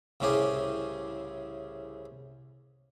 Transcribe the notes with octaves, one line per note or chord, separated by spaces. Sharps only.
C2 A2 C#3 C#4 G4 G#4